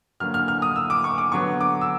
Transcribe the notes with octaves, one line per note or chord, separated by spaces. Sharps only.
D3 F#3 A#3 F6
F6
F6
D#6
E6
D6
C#6
D6
D3 F#3 B3 C#6
D6
E6